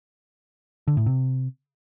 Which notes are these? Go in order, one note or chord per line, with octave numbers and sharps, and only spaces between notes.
D3
A2
C3